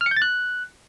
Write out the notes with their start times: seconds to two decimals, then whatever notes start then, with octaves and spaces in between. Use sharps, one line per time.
0.01 F6
0.06 C#7
0.11 G6
0.16 A6
0.22 F#6